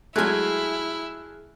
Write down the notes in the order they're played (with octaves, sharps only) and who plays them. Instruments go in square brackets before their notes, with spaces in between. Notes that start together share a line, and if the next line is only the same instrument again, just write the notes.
[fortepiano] F#3 G#3 A3 [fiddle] E4 [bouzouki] G#4 G#5 [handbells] F6 F#6